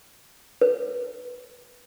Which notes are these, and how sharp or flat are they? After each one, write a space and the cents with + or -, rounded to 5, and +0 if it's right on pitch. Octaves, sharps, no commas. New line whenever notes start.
B4 -5